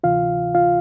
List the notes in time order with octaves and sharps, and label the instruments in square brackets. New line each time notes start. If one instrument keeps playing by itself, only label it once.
[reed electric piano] D2 C3 E3 F4 F5
F4 F5